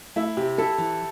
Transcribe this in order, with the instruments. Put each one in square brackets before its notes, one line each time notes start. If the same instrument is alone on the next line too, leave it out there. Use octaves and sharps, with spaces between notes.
[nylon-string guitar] A3 [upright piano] E4
[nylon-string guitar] C3 [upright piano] G4
[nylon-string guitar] E4 [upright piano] A4
[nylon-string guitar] E3